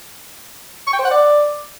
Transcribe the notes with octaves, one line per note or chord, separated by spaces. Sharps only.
C#6
G5
C5
F#5
D5